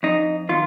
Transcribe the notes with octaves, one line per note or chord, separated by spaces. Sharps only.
F2 D#4
D#3 F4